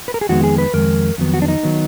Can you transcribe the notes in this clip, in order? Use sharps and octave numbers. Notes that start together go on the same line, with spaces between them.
B4
A#4
G#4
F2 D#3 G#3 B3 F#4
G#4
B4
F2 D#3 G#3 A#4
F2 D#3 F#3 B3
F#4
D4
D#4
D#3 F#3 B3